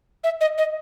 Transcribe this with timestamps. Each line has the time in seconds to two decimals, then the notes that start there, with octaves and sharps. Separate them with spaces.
0.24 E5
0.41 D#5
0.58 D#5